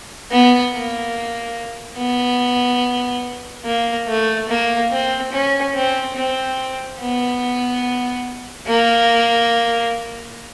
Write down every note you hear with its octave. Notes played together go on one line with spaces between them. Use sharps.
B3
A#3
B3
A#3
A3
A#3
C4
C#4
C4
C4
B3
A#3